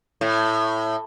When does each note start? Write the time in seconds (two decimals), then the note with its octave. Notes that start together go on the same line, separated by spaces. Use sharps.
0.21 A2